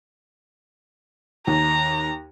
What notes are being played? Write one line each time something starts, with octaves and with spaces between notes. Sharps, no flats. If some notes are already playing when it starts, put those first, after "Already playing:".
D#2 A#5